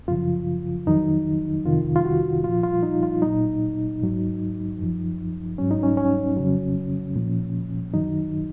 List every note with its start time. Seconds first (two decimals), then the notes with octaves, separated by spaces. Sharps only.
0.08 F#2 C#3 F3 F4
0.87 F2 D#3 F#3 D#4
1.66 F2 C3 D#3 F4
1.96 F4
2.05 F#4
2.43 A#2 F3 F4
2.63 F4
2.83 D#4
3.03 F4
3.22 A#2 F#3 D#4
4.01 G#2 F#3
4.79 F#2 F3
5.58 G#2 F#3 C#4
5.71 D#4
5.83 C#4
5.97 C#4
6.37 F2 C#3 F#3
7.16 A#2 F3
7.94 F#2 D#3 F#3 D#4